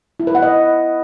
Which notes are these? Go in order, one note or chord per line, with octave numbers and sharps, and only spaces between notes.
E4
B4
F#5
D#5